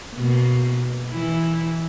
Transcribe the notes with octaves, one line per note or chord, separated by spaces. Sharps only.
B2 A#3
E3 E4